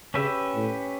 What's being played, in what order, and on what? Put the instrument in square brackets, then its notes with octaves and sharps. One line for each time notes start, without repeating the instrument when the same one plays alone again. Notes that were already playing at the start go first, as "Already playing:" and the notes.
[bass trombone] C#3 [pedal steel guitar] C#4 G4 B4 E5
[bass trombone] A2